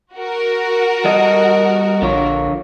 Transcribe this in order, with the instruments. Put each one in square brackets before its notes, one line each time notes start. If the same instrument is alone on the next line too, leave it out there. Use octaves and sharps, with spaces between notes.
[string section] F#4 A#4
[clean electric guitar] G3 A4 D#5
[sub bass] A#1 [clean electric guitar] D3 F4 C#5